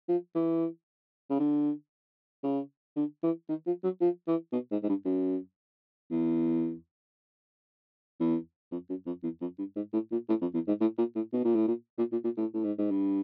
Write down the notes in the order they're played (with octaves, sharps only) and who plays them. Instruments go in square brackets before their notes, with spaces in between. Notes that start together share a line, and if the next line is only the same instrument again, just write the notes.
[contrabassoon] F3
E3
C#3
D3
C#3
D3
E3
D#3
F3
F#3
F3
E3
B2
G#2
G#2
G2
F#2
E2
E2
F2
F#2
F2
E2
F2
G2
G#2
A2
A#2
A2
F2
E2
G#2
A2
A#2
A2
B2
A#2
A2
A#2
A#2
A#2
A#2
A2
A2
G#2
G#2
G2